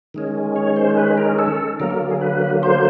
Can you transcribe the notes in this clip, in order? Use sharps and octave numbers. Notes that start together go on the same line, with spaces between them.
D#3 G#3 C#4
C#5
C5
B4
A#4
A4
D3 F#3 A#3 A#4
A#4
G#4
B4
C5